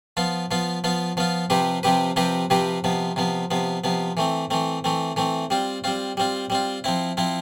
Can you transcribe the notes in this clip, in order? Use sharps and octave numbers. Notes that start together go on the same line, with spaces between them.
F3 B3 F4
F3 B3 F4
F3 B3 F4
F3 B3 F4
C3 F3 C4 G4 B4
C3 F3 C4 G4 B4
C3 F3 C4 G4 B4
C3 F3 C4 G4 B4
C3 F3 B3
C3 F3 B3
C3 F3 B3
C3 F3 B3
E3 A3 C4
E3 A3 C4
E3 A3 C4
E3 A3 C4
G3 C4 F4
G3 C4 F4
G3 C4 F4
G3 C4 F4
F3 C4 E4
F3 C4 E4